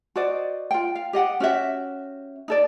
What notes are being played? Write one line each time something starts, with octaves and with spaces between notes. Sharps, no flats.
F#4 C5 D5 D#5
F4 G5
F5
G4 D#5 F#5 G5
C#4 F#4 G4 E5
D#4 A4 D5